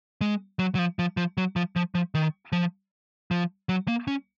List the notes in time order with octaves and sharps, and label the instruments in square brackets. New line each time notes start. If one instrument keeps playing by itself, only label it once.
[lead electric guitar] G#3
F#3
F#3
F3
F3
F3
F#3
F3
F3
F3
D#3
F3
F3
F#3
A#3
C#4